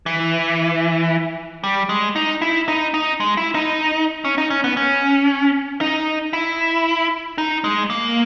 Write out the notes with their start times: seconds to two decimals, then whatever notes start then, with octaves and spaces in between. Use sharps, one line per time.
0.06 E3
1.64 G3
1.89 G#3
2.16 D#4
2.42 E4
2.68 D#4
2.94 D#4
3.20 G#3
3.37 E4
3.55 D#4
4.25 C#4
4.38 D#4
4.50 C#4
4.64 B3
4.77 C#4
5.81 D#4
6.33 E4
7.38 D#4
7.64 G#3
7.90 A#3